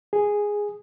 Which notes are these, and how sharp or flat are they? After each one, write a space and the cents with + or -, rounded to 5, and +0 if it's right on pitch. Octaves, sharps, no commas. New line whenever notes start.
G#4 -5